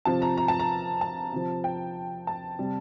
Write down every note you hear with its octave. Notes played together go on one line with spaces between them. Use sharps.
C3 F3 A5
A#5
A#5
A5
A#5
A5
C3 F3
G5
A5
C3 G3